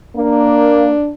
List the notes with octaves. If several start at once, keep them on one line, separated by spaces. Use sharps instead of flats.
A#3 D4